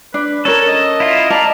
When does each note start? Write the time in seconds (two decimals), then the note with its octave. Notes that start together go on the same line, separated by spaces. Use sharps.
0.14 D4 B4
0.45 C#4 A4 A#4 C#5
0.68 D#5
1.00 E4 F4
1.30 A#4 D5 D#5 A5